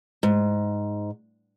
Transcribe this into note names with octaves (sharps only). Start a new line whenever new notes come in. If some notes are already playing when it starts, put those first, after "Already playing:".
G#2